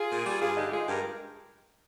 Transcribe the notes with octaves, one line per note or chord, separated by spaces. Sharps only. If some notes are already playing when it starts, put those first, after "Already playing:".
Already playing: F4 G#4
A#2
G3
G2 F4 G#4
D3 D#4 G4
G#3 F4 G#4
G2 G4 A#4